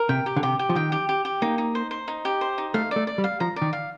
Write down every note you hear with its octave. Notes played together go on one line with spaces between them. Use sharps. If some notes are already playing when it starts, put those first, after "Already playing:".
Already playing: A#4
C3 G5
G4
D3
C3 G4
G4
F3
D#3 G5
G4
G4
G4
A#3 D#4
D#4
C5
C5
D#4
G4
C5
D#4
A3 F5
A3 D5
D5
G3
F5
F3 A#5
D5
D#3
F5